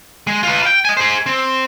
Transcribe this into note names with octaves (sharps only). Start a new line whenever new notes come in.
G#3
F4 B4
F5 G5
D#5 G#5
G#4 C5
C4